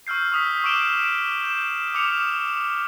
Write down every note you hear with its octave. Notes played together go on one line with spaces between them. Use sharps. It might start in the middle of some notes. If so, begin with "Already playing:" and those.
C#6 E6 F6 G6 C7
C#6 D#6 B6
C#6 D6 E6 D7 E7 G7
G6 E7
D6 D#6 F6 C#7 F7